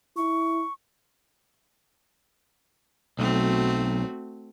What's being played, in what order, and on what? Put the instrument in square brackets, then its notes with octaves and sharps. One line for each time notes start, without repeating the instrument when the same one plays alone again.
[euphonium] E4 [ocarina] C#6
[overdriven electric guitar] B1 [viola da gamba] A3 C4 F#4